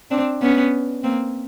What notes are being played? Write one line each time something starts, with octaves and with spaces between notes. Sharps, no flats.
C4 D4
B3 C#4
A#3 C4